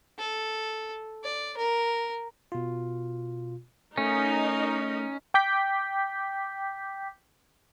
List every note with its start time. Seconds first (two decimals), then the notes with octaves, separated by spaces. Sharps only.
0.19 A4
1.24 D5
1.58 A#4
2.52 B2 F4
3.97 A3 C#4 D#4 A#4 D#5
5.34 G5 D6 G6 B6